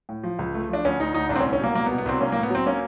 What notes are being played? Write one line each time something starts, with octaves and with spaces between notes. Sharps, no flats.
A2
F3
C#2
A3
F3 D4
D2 C#4
D2 D#4
D2 D#4
C2 D4
C4
C#4
C2
C#4
B2 A#3
C2 A#3
B3
B2
B3
C2 C4
A#3 C#4
A#3
A2
B3
F#3 C4
A#3 C#4